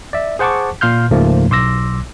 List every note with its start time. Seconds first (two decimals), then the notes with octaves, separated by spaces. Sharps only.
0.13 D5 E5
0.39 G#4 C5 F#5 A5 C#6 D6
0.81 A#2 F5 C6 F6 G6
1.11 C#2 G#2 C#3 F3 A3 A#3
1.50 B1 C6 D6 E6 A#6